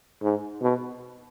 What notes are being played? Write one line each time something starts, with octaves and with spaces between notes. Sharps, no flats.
G#2
B2